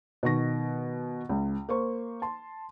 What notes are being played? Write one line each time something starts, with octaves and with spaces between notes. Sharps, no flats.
B2 D#3 C#6 A#6
C#2
A#3 C5 C#6
A5 C6